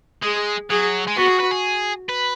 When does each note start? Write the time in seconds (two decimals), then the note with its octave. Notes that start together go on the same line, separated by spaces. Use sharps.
0.23 G#3 G#4
0.70 F#3 G#4
1.07 G#3
1.16 B3 F#4
1.28 G#4
1.40 B4
1.51 G#4
2.09 B4